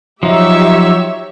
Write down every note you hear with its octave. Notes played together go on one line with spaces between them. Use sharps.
F3 F#3 D#4 G4 C#5 E5